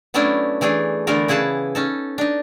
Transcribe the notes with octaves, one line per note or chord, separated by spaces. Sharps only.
F#3 A3 B3 C#4 D4 E4
E3 A3 D4 G#4
D3 E3 A3 B3 A#4
C#3 E4 G#4 F#5 A5
C#4 D#4 A4
D4 D#4